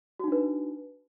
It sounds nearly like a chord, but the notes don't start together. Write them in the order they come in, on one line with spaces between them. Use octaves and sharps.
F#4 D#4 D4 B4